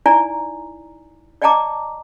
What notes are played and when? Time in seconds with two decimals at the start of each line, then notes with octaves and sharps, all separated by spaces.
0.06 D#4 E4 D5 G#5 A#5
1.42 D5 D#5 G5 A5 A#5 D6